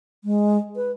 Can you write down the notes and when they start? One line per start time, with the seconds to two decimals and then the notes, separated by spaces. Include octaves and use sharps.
0.24 G#3
0.76 B4